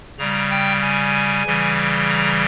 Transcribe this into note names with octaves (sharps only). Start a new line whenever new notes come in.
C#3 G3 A#5
G5
G#5
C#3 E3 G3
A#5